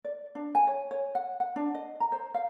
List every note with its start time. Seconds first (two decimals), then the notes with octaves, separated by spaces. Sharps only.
0.04 D5
0.35 D4
0.55 G#5
0.67 C#5
0.91 C#5
1.15 F#5
1.40 F#5
1.56 D4
1.75 D#5
2.00 A#5
2.12 C5
2.34 F5